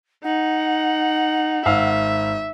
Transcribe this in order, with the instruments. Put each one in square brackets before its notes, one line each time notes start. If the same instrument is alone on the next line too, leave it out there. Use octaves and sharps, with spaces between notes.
[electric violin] D#4 [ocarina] F#5
[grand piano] G#1 F5 E6 [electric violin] E5